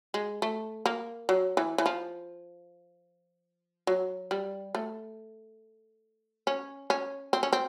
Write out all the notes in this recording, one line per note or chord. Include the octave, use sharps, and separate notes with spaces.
G#3
A3
A#3
F#3
E3
E3
F3
F#3
G3
A3
C#4
C#4
C4
C#4
C4